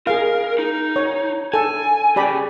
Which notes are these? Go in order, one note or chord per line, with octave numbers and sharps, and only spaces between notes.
G#4 A#4 F5
D#4
C#5
A4 G#5
C#3 G4 D5 B5